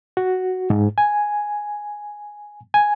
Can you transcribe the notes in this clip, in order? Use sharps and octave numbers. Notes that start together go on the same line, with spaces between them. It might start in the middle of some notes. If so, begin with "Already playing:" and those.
F#4
G#2
G#5
G#5